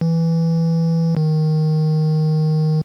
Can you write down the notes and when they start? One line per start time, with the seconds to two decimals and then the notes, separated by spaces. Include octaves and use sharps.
0.01 E3
1.17 D#3